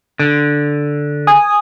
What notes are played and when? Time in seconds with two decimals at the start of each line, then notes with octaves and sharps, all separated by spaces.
0.20 D3
1.27 G#5 D#6